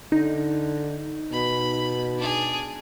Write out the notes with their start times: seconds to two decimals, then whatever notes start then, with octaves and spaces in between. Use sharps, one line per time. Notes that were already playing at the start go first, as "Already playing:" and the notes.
0.12 D3 D#4
1.32 B2 B5
2.17 D4 G#4